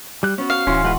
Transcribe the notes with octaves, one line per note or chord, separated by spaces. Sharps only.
G3 F#6
B3 C#4 F#4
F5
D1 E3 C#4 F#4 C6
G#3 F4 B4 F#5 C#6